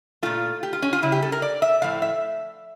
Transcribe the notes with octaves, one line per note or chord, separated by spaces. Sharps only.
A#2 A3 F4
G4
F4
C#4
F4
C#3 G3 E4
G4
A4
A#4
D5
E5
A2 F3 A3 F5
E5